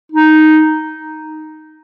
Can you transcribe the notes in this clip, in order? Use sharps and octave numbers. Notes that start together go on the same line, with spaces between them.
D#4